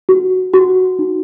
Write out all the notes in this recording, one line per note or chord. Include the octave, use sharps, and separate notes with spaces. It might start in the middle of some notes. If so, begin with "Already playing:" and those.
F#4
F#4
D#4